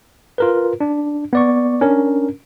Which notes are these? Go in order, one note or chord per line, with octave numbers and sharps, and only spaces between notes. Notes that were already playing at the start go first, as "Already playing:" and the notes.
F4 A#4 B4
D4
B3 D5 C#6
C#4 D4 A#4